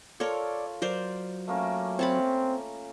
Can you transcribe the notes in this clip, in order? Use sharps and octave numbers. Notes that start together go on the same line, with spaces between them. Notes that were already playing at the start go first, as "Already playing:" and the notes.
F4 A4 A#4 C#5 D5
F#3 A#4 C5 D5
A3 A#3 C#4
C4 C#5 A5 B5